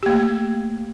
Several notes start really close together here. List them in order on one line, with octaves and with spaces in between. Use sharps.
G4 A#3 A3